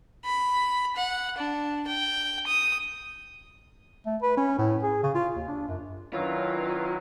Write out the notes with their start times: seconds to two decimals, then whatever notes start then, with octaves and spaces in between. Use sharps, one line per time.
0.25 B5
0.96 F#5
1.38 D4
1.87 G5
2.47 D#6
4.06 A3
4.22 B4
4.37 C#4
4.58 A2
4.82 G#4
5.03 C#3
5.15 F4
5.36 D#2
5.48 D4
5.68 F#2
6.13 D#3 F#3 C#4 D4 E4 F4 B4 C#5